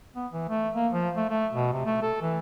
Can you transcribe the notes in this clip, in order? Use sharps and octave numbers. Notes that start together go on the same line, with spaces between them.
B3
E3
A3
A#3
F3
A3
A3
B2
C3
A3
A4
E3